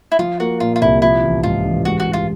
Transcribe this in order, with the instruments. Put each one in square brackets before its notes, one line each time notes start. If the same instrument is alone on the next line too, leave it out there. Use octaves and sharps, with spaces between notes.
[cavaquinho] E4
[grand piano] F3 [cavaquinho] F4
[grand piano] A#3 [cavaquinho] F#4
[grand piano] A#2 [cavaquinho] F4
[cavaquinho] F4
[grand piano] C2 [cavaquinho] E4
[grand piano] F3 [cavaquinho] E4
[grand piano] A1
[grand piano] G#2 [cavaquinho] F4
[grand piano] A1
[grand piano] G#3 [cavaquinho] F#4
[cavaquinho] F#4
[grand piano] G2
[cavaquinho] F4